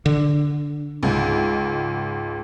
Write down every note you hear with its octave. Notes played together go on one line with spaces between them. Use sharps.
D3
C#2 G#2